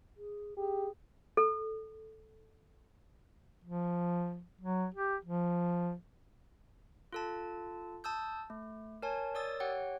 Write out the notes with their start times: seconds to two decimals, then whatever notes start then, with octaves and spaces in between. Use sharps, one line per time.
0.17 G#4
0.57 G4 G#4
1.37 A4
3.64 F3
4.61 F#3
4.94 G4
5.25 F3
7.13 F4 A4 A5
8.04 A5 D#6 E6 G6
8.50 A3
9.02 A#4 C#5 G#5 A5
9.34 A#4 C#5 D5 D#6 E6 A6
9.60 G4 C#5 F#5 G5